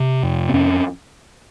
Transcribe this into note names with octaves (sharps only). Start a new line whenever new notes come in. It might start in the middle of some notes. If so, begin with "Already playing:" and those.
Already playing: C3
F2
C4
F2 C#4